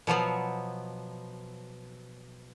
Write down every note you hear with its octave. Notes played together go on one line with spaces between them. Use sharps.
B2 F3 F#3 B3